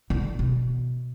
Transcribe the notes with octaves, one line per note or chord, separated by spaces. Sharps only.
D3
B2